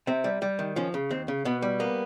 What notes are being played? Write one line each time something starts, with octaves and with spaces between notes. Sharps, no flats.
C3 C4
G3
G3
D#3
F3 C#4
C#3
D#2 C4
C#3
B2 B3
G3
A#3 B3